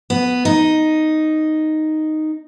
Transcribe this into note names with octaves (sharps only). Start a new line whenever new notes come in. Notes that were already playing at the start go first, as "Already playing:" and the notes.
B3
D#4